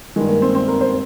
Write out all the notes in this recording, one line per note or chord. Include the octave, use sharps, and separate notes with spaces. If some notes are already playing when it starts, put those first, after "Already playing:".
G2 D#3 G#3
A#3
C4
C4
A#4
C5